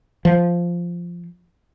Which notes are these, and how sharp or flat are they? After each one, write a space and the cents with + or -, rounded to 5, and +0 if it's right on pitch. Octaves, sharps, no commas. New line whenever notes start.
F3 -5